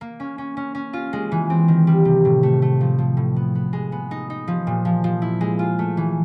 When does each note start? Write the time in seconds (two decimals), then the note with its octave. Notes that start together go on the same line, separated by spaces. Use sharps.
0.01 A#3
0.20 C#4
0.38 C#4
0.57 C#4
0.75 C#4
0.93 F4
1.13 G#3
1.32 E3
1.50 C4
1.68 D#3
1.87 G3
2.05 C3
2.25 A2
2.43 A3
2.62 A3
2.81 F3
2.98 F3
3.17 A2
3.36 B3
3.55 B3
3.73 G#3
3.92 B3
4.11 D#4
4.30 D#4
4.48 F3
4.67 A#2
4.85 F3
5.04 F3
5.22 E4
5.41 G#3
5.59 F4
5.79 A3
5.97 E3